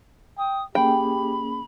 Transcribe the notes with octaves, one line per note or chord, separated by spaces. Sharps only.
G5 D#6
A#3 C#4 G4 G#4 G5 B5